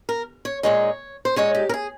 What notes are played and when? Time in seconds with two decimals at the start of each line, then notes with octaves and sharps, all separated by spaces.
0.09 A#4
0.45 C#5
0.63 A#2 G#3 D#4 C#5
1.25 C5
1.36 A#2 G#3 D#4 C#5
1.55 G4
1.69 A#4
1.74 G#4